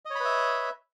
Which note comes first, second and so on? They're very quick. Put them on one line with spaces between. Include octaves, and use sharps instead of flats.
D#5 C#5 B5 B4 E5